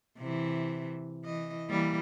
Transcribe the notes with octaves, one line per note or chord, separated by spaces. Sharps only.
C3 E3
E3 D#5
E3 G3 A#3